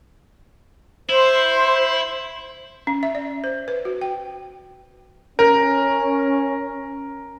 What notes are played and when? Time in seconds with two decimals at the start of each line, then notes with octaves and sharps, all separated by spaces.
1.09 E4 C5
2.87 C#4
3.03 E5
3.15 D5
3.44 C5
3.68 B4
3.85 F#4
4.01 G5
5.39 C#4 A#4